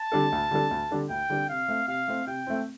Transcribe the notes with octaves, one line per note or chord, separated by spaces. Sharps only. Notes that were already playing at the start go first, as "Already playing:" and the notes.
Already playing: A5
D3 G3 D4 A4
D2
D3 G3 D4 A4
D2
D3 G3 D4 A4
D2 G5
D3 G3 D4 A4
C3 F5
A3 C4
C3 F5
A3 C4
C3 G5
A3 C4